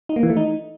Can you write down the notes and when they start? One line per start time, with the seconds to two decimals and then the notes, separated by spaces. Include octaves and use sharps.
0.09 D#4
0.16 A#3
0.23 E3
0.30 A3
0.37 D#4